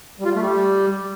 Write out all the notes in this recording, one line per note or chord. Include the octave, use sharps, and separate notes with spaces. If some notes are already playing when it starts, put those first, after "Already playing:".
G3
F4
G3
A3
G3